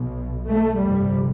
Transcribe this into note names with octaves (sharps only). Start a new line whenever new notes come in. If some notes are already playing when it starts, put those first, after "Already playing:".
Already playing: B1 B2
A3
G1 F2 C3 G3